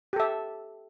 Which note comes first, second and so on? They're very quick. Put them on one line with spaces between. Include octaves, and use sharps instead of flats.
G4 A4 E5